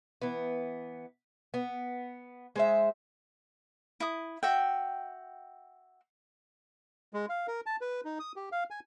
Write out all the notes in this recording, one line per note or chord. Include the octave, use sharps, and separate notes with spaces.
E3 B3
B3
G#3 C5 E5
E4 D#6
F#4 E5 G5
G#3
F5
A#4
A5
B4
D#4
D#6
G4
F5
G#5